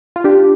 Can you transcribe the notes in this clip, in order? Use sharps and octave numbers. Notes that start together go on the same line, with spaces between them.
F4
D4 G4